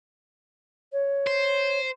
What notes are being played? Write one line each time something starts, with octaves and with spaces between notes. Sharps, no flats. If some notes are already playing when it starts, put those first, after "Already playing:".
C#5
C5